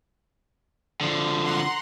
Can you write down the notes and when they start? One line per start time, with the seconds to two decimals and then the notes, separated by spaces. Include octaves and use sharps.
1.01 D3 F3
1.44 F#5 A#5 C6